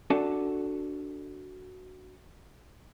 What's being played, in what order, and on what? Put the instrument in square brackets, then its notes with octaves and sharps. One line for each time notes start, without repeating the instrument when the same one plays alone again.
[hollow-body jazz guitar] D4 F#4 A4 E5 A5